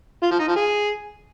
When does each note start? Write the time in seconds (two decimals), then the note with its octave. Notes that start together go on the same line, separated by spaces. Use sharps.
0.23 F4
0.31 F3
0.39 D#4
0.48 F3
0.56 G#4